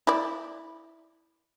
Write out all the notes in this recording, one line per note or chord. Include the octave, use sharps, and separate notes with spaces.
E4 D5